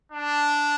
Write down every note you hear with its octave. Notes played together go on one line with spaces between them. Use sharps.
D4